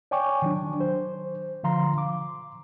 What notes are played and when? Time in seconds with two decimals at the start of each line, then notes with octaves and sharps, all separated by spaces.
0.11 C#5 D5 G5 G#5 C#6 D6
0.42 D#3 F#3 D4
0.80 C5
1.63 D3 F3 F5 A#5 C6
1.98 D6